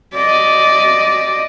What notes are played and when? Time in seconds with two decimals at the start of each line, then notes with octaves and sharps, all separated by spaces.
0.14 D5 D#5